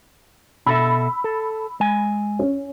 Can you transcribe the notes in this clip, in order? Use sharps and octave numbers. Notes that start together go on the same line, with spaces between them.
B2 A4 E5 B5 E6
A4
G#3 G#5
C#4